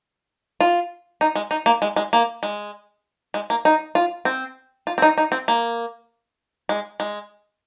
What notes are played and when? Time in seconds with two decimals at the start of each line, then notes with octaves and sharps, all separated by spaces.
0.61 F4
1.21 D#4
1.35 G#3
1.51 D#4
1.66 A#3
1.82 G#3
1.96 G#3
2.13 A#3
2.43 G#3
3.34 G#3
3.50 A#3
3.65 D#4
3.95 F4
4.25 C4
4.87 F4
4.98 C4
5.02 D#4
5.18 D#4
5.32 C4
5.48 A#3
6.69 G#3
7.00 G#3